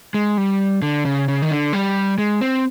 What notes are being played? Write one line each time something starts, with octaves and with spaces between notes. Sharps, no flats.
G#3
G3
D3
C#3
C#3
D#3
D3
G3
G#3
C4